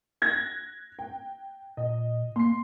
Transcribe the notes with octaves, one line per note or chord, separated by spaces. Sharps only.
F#6 G#6 A#6
G5
A#2 D#5
A#3 C6 C7